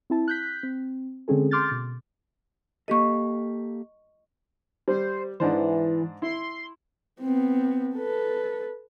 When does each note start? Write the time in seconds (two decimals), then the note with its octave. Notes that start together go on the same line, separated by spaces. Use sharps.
0.10 C4 E4 A5
0.28 F#6 G6 B6
0.63 C4
1.28 D3 G#3 C4 C#4 G#4 A4
1.51 C6 D6 F6 G6 A6
1.71 B2
2.88 A#3 G4 A4 D#5 C#6
4.88 G3 C5
5.40 G#2 E3 D4 C5
6.22 E4 C6
7.21 B3 C4
7.96 A4 B4